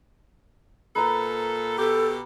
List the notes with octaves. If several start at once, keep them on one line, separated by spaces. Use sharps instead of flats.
A#2 A4 B4 A#5
B2 G4 A4